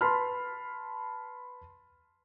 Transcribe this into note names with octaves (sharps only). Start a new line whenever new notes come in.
B4 A5 B5 C6 F6